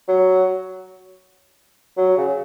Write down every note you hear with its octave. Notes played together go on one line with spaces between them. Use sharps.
F#3
F#3
C#3